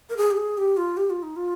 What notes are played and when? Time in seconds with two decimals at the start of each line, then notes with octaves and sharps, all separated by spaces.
0.10 A#4
0.17 G#4
0.31 G4
0.37 G#4
0.58 G4
0.77 F4
0.97 G4
1.10 F4
1.23 D#4
1.36 F4